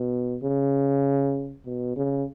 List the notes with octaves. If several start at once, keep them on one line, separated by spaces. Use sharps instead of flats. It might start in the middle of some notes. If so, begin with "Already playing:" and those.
Already playing: B2
C#3
B2
C#3